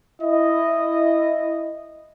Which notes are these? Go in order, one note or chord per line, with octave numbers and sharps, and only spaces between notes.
E4 D#5